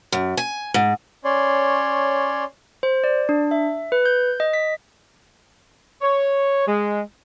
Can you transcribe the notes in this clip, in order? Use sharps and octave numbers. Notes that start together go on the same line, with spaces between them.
F#2
G#5
G#2
C#4 C#5 D5 C6
C5
D5
D4
E5
B4
G6
D#5
B6
C#5
G#3